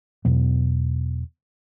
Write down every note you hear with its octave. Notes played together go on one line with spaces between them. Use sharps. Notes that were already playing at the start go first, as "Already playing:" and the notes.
E2 B2 F#3 B3